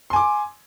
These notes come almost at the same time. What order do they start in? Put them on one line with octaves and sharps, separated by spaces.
C6 G#5 D6